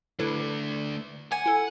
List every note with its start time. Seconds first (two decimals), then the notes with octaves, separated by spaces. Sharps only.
0.19 D3 A3 E4 A4 B4
1.32 F#5 G#5
1.46 E4 A4